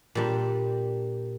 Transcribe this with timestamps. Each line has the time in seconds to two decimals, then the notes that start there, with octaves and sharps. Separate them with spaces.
0.15 A#2 G3 D4